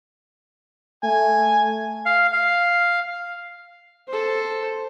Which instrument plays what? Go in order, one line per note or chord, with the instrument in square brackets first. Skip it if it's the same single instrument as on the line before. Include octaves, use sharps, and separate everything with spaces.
[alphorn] A3 [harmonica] G#5
[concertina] F5
F5
[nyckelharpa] A4 C5